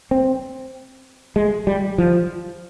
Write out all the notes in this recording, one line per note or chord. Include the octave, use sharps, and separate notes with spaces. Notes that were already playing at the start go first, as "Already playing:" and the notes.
C4
G#3
G3
F3